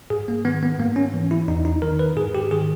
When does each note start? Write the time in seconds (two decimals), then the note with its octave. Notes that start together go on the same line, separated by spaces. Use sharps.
0.10 G#2 G#4
0.28 A#3
0.45 D#3 B3
0.63 B3
0.79 G#2 A#3
0.96 C#4
1.14 E3
1.31 E4
1.48 E2 D#4
1.65 D#4
1.82 D#3 A#4
1.99 B4
2.17 G#2 G#4
2.35 G4
2.51 D#3 G#4